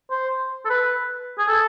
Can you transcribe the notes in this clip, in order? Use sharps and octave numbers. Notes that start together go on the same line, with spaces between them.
C5
A4
B4
G#4
A4